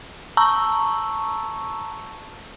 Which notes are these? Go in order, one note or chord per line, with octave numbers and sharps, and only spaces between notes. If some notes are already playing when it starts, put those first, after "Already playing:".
A5 A#5 C#6 E6